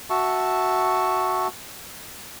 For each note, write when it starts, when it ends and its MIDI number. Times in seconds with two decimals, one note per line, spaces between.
0.10 1.48 66
0.10 1.48 76
0.10 1.48 81
0.10 1.48 85